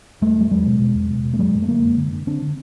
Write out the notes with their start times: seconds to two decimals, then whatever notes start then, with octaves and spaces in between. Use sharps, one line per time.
0.21 E2 G3 A3
0.37 E2 G3
0.51 E2 F#3 G#3
0.66 B2
0.80 B2
0.95 E2
1.10 B2
1.24 B2
1.34 A3
1.39 F#2 F#3 G#3
1.54 F#2
1.62 A3
1.68 D3 G#3 A#3
1.84 F#2
1.97 D3
2.12 D3
2.27 D3 C4 D4
2.42 D3